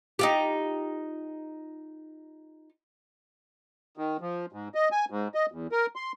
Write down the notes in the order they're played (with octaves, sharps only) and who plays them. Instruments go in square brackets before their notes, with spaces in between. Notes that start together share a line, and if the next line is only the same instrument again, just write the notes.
[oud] D#4 F4 G4
[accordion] D#3
F3
G#2
D#5
G#5
G#2
D#5
E2
A#4
C6